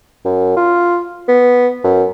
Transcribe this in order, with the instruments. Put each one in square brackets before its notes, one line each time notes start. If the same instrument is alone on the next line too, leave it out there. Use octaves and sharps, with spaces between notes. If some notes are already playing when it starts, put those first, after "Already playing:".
[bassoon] F#2
F4
B3
F#2